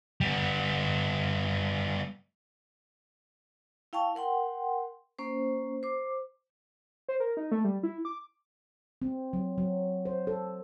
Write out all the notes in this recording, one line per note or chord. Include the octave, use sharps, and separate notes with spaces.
G3 B3
E4 F5 G5 A5 C#6
A#4 F#5 G5 C6
A#3 C#4 C5
C5 D6
C5
A#4
D#4
A3
G3
E4
D6
C4
F#3
F#3
C5
A4